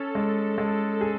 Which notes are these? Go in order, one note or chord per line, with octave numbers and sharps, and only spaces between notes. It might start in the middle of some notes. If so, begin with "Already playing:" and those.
Already playing: C#4 A4
G#3
G#3
G#4